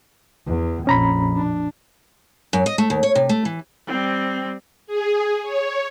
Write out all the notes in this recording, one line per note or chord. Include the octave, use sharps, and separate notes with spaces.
E2
A#1 F2 C#4 A#5 B5
D4
F#2
D#5
A3
D#2
C#5
C3
A3
E3
G3 C4
G#4
C#5